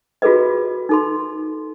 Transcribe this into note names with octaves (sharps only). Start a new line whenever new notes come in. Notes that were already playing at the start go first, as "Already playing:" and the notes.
F4 F#4 G#4 A4 B4 D#5
D#4 A4 C6